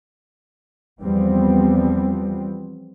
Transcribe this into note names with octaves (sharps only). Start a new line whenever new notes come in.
E2 F3 G3 B3 C4